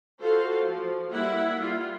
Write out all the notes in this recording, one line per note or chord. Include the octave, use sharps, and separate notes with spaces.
F4 F#4 A4 C5 F5
F3
G3 A#3 E4 E5 F#5
G3 F4